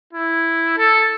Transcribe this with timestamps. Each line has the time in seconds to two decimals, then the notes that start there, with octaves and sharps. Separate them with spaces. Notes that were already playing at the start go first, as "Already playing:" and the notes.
0.13 E4
0.78 A4